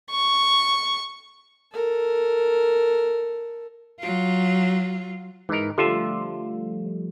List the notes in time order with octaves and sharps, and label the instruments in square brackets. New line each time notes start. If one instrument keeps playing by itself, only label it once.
[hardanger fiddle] C#6
[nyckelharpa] A4 A#4
[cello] F#3 F4
[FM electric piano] G#2 D#4 [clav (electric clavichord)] E3 A#4
[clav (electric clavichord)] D3 F4 E5 [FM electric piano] F3 G3 A3